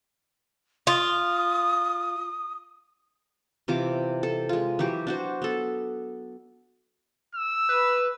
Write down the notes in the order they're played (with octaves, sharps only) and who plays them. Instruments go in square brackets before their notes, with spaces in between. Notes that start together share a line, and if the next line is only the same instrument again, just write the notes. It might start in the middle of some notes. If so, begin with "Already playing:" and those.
[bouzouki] F4 [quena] D#6
[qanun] C3 E3 F4 D6
A4
G#3 F4
E3 F#3 G4
D4 F#4 C5
B3 A4
[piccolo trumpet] E6
[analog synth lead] B4